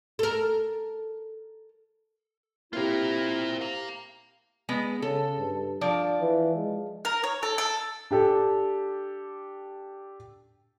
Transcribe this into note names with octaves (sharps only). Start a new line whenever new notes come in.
A4 A#4
A#3 C4 E4 F4 G4 A#4
F5 A#5
G#3 B3
C#3 A4
G2
F3 D4 D5
E3
G#3
A#4
C#5
A4
A4
D4 G4 A4